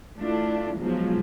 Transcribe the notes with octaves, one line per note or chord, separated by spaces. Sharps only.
A3 D4 E4 F4
G#2 B2 F3 F#3